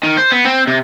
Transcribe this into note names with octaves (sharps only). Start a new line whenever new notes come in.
D#3
C5
B3
C4
C3